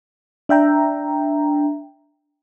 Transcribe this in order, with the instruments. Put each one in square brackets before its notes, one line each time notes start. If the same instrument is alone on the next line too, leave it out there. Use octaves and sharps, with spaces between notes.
[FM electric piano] D4 E5 G5 A#5